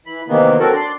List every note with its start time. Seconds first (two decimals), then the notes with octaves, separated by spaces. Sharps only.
0.06 E3 B5
0.29 C3 D#3 E3 A#3 B3
0.59 F#3 C4 F#4 A4 A#4
0.73 D4 D5 C6